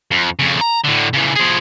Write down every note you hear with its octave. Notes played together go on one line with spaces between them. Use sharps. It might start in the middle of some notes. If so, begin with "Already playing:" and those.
F2
F2 C#3
A#5
A2 D3
C#3 E3
F3 G#4